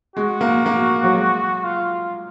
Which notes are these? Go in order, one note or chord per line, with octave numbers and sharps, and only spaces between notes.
G#3 F#4
A#3
A#3
F#3
G#3
F4